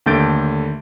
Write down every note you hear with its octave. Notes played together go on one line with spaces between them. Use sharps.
D#2 D3 A3 G6 A6 D7